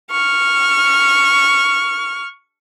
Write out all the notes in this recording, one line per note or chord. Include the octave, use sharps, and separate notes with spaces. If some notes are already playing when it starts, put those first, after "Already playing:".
C#6 F6